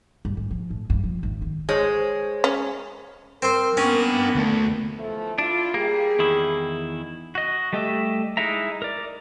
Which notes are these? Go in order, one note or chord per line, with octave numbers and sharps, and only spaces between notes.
G2
G#2
F3
A2
G2
F3
G#1
D#3
G#3 C5 C#5
C#4
C4 A#4 C5
A#3 B3 C#4 D4 G5
D2 A3
E3 F3 A3
D4 E4 F4
G3 A#3 G#4
E2 D#3 E4
F#4 D#5
G3 A3 G4 D#5 E5
G#3 D#4 E4 E5 A#5
A#4 D5